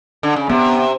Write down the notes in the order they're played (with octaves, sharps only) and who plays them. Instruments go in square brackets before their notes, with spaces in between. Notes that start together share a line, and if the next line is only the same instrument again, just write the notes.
[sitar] D3
C#3
[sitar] C3 [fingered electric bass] B3